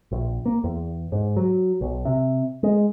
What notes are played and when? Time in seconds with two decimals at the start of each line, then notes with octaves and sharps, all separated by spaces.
0.11 A#1
0.46 A#3
0.64 E2
1.12 G#2
1.37 F#3
1.81 B1
2.05 C3
2.63 G#3